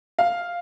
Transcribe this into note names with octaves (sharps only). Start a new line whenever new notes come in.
F5